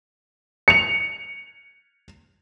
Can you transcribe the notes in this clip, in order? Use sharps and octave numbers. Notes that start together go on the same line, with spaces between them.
C#7 F7